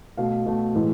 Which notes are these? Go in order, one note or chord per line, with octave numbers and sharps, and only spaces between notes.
B2 A3 F5
B2 A3
A2 E3 G#3